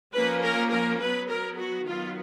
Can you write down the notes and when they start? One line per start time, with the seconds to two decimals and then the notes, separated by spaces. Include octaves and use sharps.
0.14 F3 A#3 C#4 B4
0.43 A#4
0.71 A#4
1.01 F#3 B3 B4
1.29 A#4
1.58 F#4
1.86 D#3 F#3 B3 F4